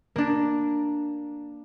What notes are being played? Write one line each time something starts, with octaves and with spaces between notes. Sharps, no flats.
A#3 D4